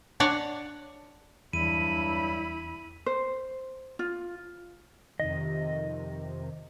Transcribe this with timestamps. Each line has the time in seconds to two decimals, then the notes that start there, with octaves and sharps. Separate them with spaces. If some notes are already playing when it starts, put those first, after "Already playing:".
0.20 D4 C#5 D5 F#5
1.53 E2 G2 F#3 G3 E4 B5 D#7
3.06 C5
3.99 F4
5.20 F2 C3 D#3 D#5